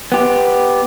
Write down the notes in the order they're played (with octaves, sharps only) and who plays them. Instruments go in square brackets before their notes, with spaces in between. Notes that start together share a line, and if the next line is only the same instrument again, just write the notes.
[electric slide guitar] B3 G4